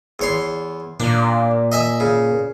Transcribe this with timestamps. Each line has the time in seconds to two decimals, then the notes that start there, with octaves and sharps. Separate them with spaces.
0.19 E2 C#5 C6
1.00 A#2 D4
1.72 D#5 E5 G#5
2.00 C#3